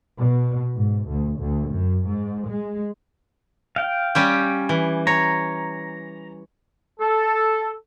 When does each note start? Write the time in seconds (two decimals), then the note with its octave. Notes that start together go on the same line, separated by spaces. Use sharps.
0.18 B2
0.76 G#2
1.09 D2
1.39 D2
1.71 F#2
2.07 G#2
2.50 G#3
3.76 F5 G5
4.15 G3 C#4 G4
4.69 E3
5.07 C#5 A#5
7.00 A4